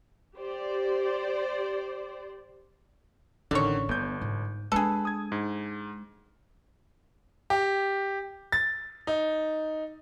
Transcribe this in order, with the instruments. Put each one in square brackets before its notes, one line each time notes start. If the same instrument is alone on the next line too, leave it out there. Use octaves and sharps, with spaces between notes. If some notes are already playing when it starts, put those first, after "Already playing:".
[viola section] G4 C5 D5
[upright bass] A1 C#4 [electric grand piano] D3 D#3 [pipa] C#5 D5
[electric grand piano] G1 G6 [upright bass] B3
[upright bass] G#2
[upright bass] G#3 D4 [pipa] G#4 A4 [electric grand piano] B4
[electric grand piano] D#6 G#6
G#2
[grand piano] G4
A6
D#4